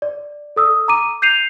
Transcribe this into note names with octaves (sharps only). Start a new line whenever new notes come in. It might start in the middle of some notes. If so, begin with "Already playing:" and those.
D5
A4 D#6 E6
A#5 D6 D#7
G6 C7 D#7 F7